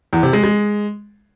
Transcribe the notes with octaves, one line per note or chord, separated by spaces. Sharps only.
E2
C3
G#3
G#3